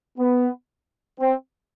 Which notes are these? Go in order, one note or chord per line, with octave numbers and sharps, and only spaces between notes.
B3
C4